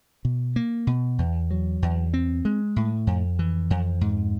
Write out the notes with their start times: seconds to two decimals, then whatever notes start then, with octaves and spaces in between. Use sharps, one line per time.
0.25 B2
0.56 A#3
0.87 B2
1.18 E2
1.51 F#3
1.82 E2
2.14 C4
2.45 G#3
2.76 A2
3.07 F2
3.39 E3
3.70 F2
4.01 G#2